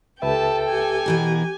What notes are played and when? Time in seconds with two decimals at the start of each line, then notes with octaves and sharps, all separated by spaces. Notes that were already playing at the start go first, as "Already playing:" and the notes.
0.22 C#2 G4 A4 B4 E5 G5 A5
0.67 G4 G#5
1.06 B2 E3 A#4